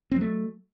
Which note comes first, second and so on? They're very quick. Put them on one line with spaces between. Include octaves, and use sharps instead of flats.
C4 F#3 A3